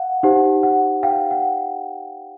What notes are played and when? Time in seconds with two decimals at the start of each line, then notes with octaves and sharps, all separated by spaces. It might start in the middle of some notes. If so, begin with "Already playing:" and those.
Already playing: F5 F#5
0.23 D#4 G4 C5 F#5
0.63 F#5
1.03 F5 G5
1.31 F#5